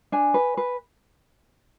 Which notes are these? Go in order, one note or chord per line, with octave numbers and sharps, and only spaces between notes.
D4 G#5
B4
B4